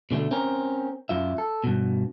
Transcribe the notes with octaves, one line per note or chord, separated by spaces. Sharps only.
B2 D3 G3 A3
C4 C#4 A#4
F#2 F4 E5
A4
G2 B2